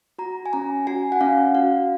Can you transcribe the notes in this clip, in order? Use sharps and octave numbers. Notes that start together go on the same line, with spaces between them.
F#4 A#5
G#5
C#4 A#5
F#4 G#5
F#5
C#4 F5
F#4 F5